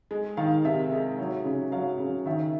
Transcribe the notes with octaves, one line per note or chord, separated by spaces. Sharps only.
G#3
D#3 F5
C3 E5
G#3
F#3
C#3
F#3 F5
C#3
D#3 E5